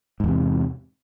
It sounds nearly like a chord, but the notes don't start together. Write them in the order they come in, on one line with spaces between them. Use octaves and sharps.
G#2 E2 C3